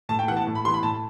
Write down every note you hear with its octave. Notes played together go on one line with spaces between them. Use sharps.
A2 A5
G5
E3 B3 F#5
A5
A2
B5
E3 B3 C6
B5
A2 A5